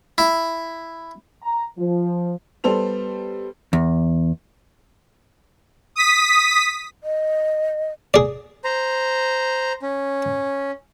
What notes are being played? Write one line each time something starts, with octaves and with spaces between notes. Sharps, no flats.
E4
A#5
F3
G3 B3 A4 C5 F7
E2
D#6 B6
D#5
G#4 D5
C5 A#5
C#4